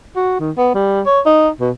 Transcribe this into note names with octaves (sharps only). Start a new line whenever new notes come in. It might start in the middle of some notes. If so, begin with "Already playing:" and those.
F#4
D#3
B3
G3
C#5
D#4
B2